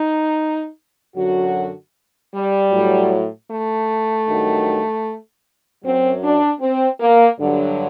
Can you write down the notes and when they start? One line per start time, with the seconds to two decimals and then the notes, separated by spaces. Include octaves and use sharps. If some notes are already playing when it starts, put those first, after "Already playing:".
Already playing: D#4
1.16 F#2 D3 F#3 F#4
2.33 G3
2.72 A2 F#3
3.50 A3
4.27 G2 D#3 F#3
5.84 F#2 F#3 C4
6.23 D4
6.61 C4
7.00 A#3
7.39 G2 D3 F#3